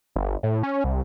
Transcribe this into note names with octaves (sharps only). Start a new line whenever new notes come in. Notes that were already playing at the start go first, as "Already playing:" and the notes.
G1
A2
C#4
C2